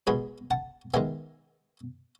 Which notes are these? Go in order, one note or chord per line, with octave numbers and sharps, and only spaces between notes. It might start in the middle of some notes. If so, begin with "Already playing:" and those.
B2 G#3 B3 G#4 B4
F#5 A5
D#3 G#3 B3 E5 G#5